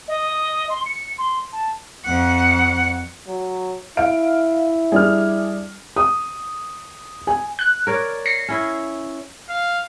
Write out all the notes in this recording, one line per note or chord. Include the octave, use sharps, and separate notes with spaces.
D#5
C6
C#7
C6
A5
F2 F#5
F#3
E4 F5 D7
G3 D4 G#4 F6
D#6
G#5
F#6
A#4 C#5 D5
A#6 C7 C#7
C#4 E4
F5